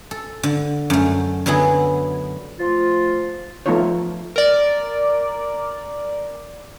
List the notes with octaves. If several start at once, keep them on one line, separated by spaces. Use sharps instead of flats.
A4
D3
F#2 A3
D3 F#3 B3 E4 G#4
F3 A3 F4
F3 A3 B3 D#4 F4 C#5
A#4 D5